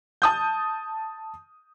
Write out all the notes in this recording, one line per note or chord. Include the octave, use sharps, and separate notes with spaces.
A5 D#6 G6